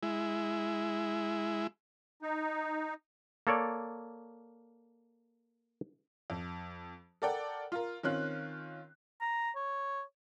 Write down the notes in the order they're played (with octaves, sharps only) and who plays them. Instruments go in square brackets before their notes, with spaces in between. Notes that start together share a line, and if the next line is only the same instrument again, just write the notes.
[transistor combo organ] G#3 E4
[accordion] D#4
[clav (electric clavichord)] A#3 A4 C#5 D5
[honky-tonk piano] F2
A4 A#4 D5 F#5 G5
F4 A#4
D#3 C4 C#4 F4 F#6
[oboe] A#5
C#5